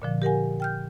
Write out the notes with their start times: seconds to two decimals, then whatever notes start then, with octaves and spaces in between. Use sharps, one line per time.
0.02 A#2 D3 F3
0.22 G4 A#4 F#5 G#5
0.60 G5 F6 G6